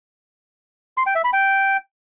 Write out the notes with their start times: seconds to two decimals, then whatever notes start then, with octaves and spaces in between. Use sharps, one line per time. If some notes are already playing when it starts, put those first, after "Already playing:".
0.97 C6
1.06 G5
1.15 E5
1.24 B5
1.33 G5